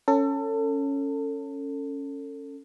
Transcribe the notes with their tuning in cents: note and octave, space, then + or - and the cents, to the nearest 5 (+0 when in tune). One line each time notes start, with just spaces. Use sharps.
C#4 +0 A4 +30